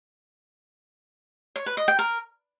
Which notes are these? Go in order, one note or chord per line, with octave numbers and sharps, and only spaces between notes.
C#5
B4
D#5
G5
A#4